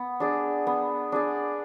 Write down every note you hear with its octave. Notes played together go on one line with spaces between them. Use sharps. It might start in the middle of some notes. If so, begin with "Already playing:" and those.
Already playing: B3
D4 G#4 D5
B3
D4 G#4 D5